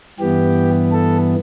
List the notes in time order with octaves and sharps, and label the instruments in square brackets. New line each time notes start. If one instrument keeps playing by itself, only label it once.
[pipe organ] G2 E3 B3 G4
A4